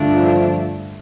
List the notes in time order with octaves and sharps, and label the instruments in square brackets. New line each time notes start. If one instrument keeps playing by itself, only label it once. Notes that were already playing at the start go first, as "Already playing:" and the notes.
Already playing: [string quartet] G2 D3 A3 D4 F4
[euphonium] F3